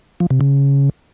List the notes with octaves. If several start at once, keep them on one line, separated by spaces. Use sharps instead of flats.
F3
C3
C#3